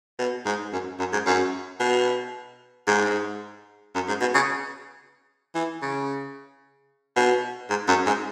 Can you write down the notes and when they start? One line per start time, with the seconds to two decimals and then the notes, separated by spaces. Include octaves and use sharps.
0.19 B2
0.46 G#2
0.73 F#2
0.99 F#2
1.13 G#2
1.26 F#2
1.80 B2
2.87 G#2
3.95 F#2
4.08 G#2
4.21 B2
4.34 C#3
5.55 E3
5.82 C#3
7.16 B2
7.70 G#2
7.88 F#2
8.06 G#2